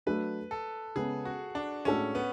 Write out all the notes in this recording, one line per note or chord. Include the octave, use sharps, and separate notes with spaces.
F#3 A3 D4 A4 B4
A4
C#3 G#3 B3 G#4
F#4
D4
A2 G#3 C#4 D4 F#4 A4
B3